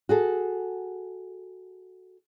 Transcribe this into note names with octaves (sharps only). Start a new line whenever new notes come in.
F#4 G#4 A4